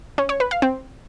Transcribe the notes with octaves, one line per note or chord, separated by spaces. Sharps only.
C#4
C#5
B4
F5
C4